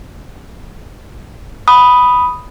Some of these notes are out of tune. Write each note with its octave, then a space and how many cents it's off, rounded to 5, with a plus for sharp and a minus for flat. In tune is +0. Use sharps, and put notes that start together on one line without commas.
B5 +0 D#6 +0